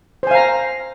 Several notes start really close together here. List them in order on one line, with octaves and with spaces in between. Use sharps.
C5 G#5 F5 A#5